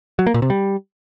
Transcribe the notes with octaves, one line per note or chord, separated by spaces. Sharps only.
F#3
A#3
A#2
C3
G3